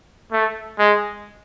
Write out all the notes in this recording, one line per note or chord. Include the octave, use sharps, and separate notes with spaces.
A3
G#3